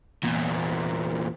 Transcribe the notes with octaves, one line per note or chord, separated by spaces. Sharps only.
E2 A#2